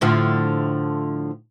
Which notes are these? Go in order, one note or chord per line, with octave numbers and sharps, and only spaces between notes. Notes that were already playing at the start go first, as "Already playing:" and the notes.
A2 D3 F3